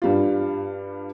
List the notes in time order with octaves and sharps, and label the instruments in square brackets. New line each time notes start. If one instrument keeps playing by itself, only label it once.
[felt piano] G2 G3 F4